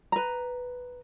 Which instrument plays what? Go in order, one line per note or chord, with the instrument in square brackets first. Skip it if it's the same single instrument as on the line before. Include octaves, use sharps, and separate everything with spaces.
[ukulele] B4 A#5